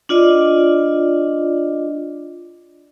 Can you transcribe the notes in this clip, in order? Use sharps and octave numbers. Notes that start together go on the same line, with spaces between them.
D4 F4 D5 D#5